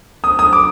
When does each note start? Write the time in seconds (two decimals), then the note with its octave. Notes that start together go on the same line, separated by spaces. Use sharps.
0.24 D#6
0.39 D#6
0.53 D6